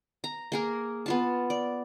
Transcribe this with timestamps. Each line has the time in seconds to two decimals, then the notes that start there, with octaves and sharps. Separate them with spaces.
0.24 A#5
0.52 A#3 G#4 A#4
1.06 B3 F4 A5
1.50 D5